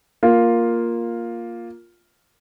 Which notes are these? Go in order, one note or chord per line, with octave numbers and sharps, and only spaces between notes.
A#3 F4